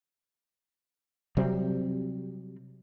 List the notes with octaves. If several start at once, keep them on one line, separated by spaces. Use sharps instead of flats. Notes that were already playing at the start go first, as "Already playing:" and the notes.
C3 F#3 G3 C4